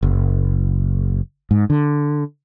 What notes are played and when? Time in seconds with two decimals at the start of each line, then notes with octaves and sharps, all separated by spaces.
0.03 F#1
1.51 G#2
1.70 D3